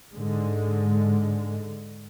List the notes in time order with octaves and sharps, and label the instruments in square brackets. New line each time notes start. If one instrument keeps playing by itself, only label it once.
[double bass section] G#2 D3 G#3